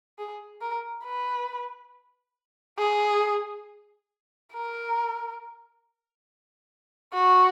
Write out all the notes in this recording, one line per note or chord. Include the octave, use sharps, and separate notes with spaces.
G#4
A#4
B4
G#4
A#4
F#4